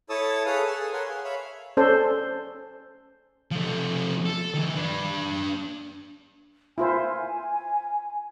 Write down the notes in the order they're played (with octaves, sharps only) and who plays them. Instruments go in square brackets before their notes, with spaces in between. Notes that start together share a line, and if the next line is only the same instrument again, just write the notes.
[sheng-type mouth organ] E4 A4 C#5 A5 D#6 E6
G#4 A4 B4 C#5 F5 D#6
G#4 A4 G#5 E6
A#4 B4 C#5 F#5 G#5 C6
G#4 F5
C#5 E5 F5 B5
[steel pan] C#4 A4 C5 D5
[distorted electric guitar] F3 A3
A4
D#3 E3
D4 B4
[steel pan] E4 F4 C5 [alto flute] G#5